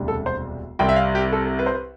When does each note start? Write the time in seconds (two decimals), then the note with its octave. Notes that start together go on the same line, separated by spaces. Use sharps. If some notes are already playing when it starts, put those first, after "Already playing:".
Already playing: E1 D2 C3 G3 D4
0.08 A4
0.26 C5
0.79 C2 C3 G3 C4 G5
0.89 E5
0.96 F5
1.15 G4
1.32 A4
1.59 B4
1.66 C5
1.75 B4